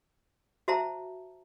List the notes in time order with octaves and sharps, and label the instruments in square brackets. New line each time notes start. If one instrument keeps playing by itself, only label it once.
[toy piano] F#4 C5 E5 A5 A#5